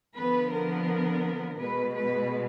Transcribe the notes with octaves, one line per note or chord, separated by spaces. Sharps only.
D3 F3 B3 B4
A#4
B2 G#3 B3 B4
B4